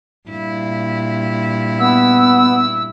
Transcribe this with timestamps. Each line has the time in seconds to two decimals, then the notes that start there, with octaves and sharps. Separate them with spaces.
0.29 G2 A#2 E4
1.79 B3 E6